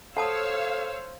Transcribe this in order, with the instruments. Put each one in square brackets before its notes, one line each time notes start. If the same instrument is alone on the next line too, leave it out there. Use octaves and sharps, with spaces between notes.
[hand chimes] A4 [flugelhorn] C5 [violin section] C#5 F5 E6 [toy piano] F#5 A5 D#6